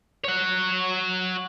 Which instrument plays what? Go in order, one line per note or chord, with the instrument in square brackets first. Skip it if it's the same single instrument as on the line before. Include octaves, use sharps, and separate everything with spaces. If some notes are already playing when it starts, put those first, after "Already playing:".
[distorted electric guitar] C#5 F#5